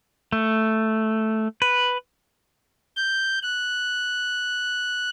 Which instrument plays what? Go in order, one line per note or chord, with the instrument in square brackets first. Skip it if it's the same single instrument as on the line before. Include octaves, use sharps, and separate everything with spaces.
[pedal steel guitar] A3
B4
[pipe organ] G6
F#6